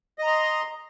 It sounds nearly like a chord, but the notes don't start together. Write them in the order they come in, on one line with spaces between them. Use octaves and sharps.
D#5 A#5 C6